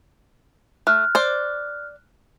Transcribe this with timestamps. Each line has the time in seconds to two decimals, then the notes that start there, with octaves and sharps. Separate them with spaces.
0.87 A3 F6 F#6
1.15 C5 D5